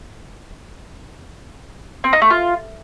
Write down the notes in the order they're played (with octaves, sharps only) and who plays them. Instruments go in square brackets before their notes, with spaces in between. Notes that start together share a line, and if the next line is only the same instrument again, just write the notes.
[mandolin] C4
D#4
A3
F4